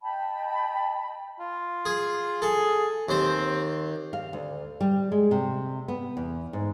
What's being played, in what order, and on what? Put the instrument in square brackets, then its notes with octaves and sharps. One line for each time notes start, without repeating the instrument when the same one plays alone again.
[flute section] D#5 G5 A5 B5
[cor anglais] F4
[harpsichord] G#4
[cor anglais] G#4 [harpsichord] A4
[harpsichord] D#2 C5 [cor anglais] C4
[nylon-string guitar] F5
D2
G3
G#3
C3
B3
E2
G#2